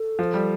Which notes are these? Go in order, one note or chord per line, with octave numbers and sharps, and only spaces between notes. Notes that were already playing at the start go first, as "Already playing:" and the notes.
Already playing: A4
F3
G3